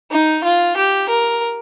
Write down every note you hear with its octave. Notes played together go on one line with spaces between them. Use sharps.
D#4
F4
G4
A#4